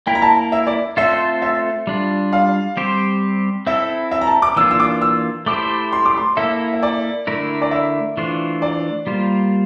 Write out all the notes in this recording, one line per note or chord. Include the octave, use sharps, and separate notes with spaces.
A#3 E4 A#4 G5
A#5
A5
E5
D5
A3 C4 F4 A4 C5 E5
E5
G3 D4 F4
F5
G3 C4 G4 C5
C4 E4 A4 E5
E5
A#5
A5
D6
E3 A#3 D4 F4 E6
E6
D6
E6
A3 E4 G4 C5 D6
C6
D6
C6
A#3 E4 A4 E5
E5
D5
D3 A3 E4 A#4
D5
E5
E3 A3 D4 F4 C5
D5
G3 A#3 F4 C5